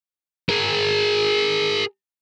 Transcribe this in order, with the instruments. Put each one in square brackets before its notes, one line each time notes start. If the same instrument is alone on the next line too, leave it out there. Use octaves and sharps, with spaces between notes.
[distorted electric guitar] G#4 A#4